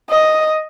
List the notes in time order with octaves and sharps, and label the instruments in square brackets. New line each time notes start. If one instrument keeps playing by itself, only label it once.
[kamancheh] D#5